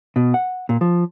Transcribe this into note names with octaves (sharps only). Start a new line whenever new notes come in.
B2
F#5
A#2
F3